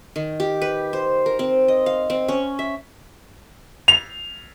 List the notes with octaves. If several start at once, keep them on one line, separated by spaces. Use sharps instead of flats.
D#3
G4
B4
C5
A#4
C4
D#5
F5
C4
C#4
E5
F7